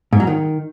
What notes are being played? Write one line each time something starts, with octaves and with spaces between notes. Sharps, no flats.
G#2
F#3
D#3